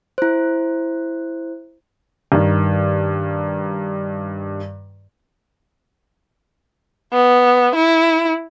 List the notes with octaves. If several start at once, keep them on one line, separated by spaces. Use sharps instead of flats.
E4 C5
G2 D#3
B3
E4